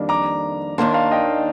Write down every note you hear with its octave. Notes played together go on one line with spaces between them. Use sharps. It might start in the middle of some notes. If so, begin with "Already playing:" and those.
Already playing: F2 D#3 G3 A#3 D4
A#5 D6
D#2 D#3 A#3 D4 A5 C6
F5 A5
D#5 G5